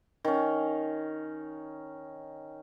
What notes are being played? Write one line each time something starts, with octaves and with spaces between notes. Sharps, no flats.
D#3 C#4